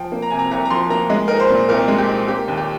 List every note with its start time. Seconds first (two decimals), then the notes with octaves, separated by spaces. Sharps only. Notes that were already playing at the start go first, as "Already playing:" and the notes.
Already playing: F3 G5
0.12 A#3
0.22 A#5
0.30 C3 G#5
0.39 A#5
0.51 C2 A#5
0.65 A#5
0.70 F3 C6
0.90 A#3 A#5
1.10 G#3 D#5
1.28 D#4 A#4
1.40 C5
1.50 A#2
1.69 C2 A#4
1.88 G#3
1.98 G4
2.08 D#4
2.28 A#3 G4
2.48 D#2
2.57 G4